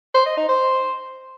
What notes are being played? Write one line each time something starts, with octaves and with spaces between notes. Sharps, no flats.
C5
D#5
D#4
C5